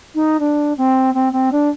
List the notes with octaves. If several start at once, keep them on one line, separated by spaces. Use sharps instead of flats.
D#4
D4
C4
C4
C4
D4